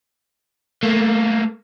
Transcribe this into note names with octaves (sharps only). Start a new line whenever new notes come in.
A3 A#3